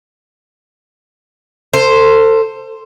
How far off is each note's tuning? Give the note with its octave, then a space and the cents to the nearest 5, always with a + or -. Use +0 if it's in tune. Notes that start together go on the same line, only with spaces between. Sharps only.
A4 +30 C5 +0